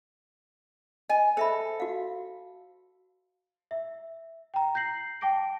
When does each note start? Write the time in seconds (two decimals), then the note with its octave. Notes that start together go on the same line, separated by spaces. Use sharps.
1.10 D#5 G#5
1.37 A4 C5 E5 B5
1.80 F#4 F5
3.71 E5
4.54 G5 A#5
4.75 G6 A#6 C7 F#7
5.21 G5 A5 D6 A#6 D7